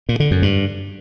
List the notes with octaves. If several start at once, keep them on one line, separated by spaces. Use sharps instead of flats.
A#2
D3
F#2
G2